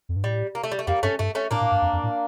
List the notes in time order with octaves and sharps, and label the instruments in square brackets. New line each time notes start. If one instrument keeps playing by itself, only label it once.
[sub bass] F2
G2
[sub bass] A2 [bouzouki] G3
[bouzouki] A#3
A3
G3
A3
[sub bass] F2 [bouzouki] G3 A#3
[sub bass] G2 [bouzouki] A3 C#4
[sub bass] G2 [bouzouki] A3
[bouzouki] A3 C#4
[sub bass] A2 [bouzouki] A#3 D4
[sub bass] A2
G2
F2
F2
A2